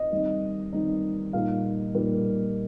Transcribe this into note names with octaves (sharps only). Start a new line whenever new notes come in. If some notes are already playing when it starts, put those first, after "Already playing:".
Already playing: D#5
D#3 G3 C4 D#4
D#3 G3 C4 D#4
A#2 G3 A#3 D#4 F5
A#2 G3 A#3 D#4